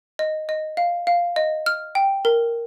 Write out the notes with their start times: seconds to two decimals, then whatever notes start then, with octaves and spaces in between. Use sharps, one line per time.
0.19 D#5
0.49 D#5
0.77 F5
1.07 F5
1.36 D#5
1.66 F6
1.95 G5
2.25 A#4